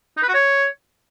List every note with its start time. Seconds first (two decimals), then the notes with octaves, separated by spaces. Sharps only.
0.17 D#4
0.23 B4
0.28 F#4
0.34 C#5